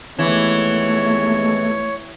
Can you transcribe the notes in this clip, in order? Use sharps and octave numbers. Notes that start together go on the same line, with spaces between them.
D#2 E3 G#3 A3 B3 C#5